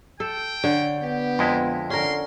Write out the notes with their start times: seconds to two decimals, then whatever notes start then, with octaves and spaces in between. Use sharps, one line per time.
0.20 A4 G5
0.64 D3 C#5
1.03 B3 G4
1.39 F2 G#3 E4 F4
1.90 D3 C#4 A#4 C6